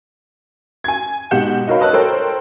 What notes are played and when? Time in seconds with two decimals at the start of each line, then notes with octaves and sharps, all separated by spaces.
0.84 G#5 G#6
1.31 G#2 B2 G4 F#5 G6 E7
1.67 D#4 F#4 A#4 C#5 F5 B5
1.80 B4 C#5 D#5 A5 E6 F#6
1.93 A4 A#4 C5 C#5 G5